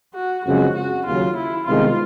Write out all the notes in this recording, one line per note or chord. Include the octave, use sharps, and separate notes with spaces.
F#4
F#2 C#3 F3 G#3 C4 F#4
F#4
D#2 C#3 F#3 F4
E4
C2 C3 D#3 G#3 B3 F4